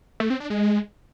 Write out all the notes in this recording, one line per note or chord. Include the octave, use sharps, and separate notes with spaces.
A3
C4
D4
G#3